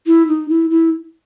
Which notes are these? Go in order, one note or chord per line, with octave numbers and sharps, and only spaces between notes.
E4
D#4
E4
E4